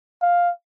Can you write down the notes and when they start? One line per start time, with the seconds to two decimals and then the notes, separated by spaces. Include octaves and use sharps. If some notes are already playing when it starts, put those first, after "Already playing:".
0.22 F5